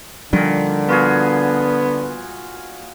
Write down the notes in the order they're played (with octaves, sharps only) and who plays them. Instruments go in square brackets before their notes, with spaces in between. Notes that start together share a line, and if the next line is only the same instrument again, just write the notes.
[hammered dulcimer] A#2 D#3 [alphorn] D3 [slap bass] F3 G3 D4
[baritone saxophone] B3 [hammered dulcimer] F4 F#4 G#4